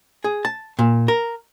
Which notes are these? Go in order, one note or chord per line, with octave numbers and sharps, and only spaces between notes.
G#4
A5
A#2
A#4